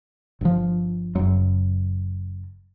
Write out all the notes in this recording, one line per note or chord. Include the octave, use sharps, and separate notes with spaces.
G1 F3
F#1 F#2